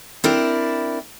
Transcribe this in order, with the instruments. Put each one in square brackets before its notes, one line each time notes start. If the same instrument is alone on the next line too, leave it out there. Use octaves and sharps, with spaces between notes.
[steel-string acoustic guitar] C4 D4 E4 A#4 D5